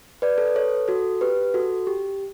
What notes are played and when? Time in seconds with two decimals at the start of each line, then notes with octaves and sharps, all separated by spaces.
0.22 B4 D5
0.38 A4
0.47 B4
0.56 A4 C#5
0.88 F#4 A4
1.21 G4 B4
1.54 F#4 A4
1.87 G4